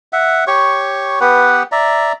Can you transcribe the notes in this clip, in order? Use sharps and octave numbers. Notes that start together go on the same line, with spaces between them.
E5 F#5
G4 C#5 C#6
B3 G4 B4 F#5
D5 E5 A#5